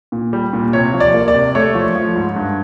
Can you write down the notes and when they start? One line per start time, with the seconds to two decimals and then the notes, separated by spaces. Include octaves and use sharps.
0.12 A#2
0.33 G3
0.53 A#2
0.73 C3 C#5
0.94 F3
1.00 D5
1.14 A#3
1.28 D5
1.34 C3
1.55 A3 C#5
1.75 F3
1.95 F3
2.16 G#2
2.36 G2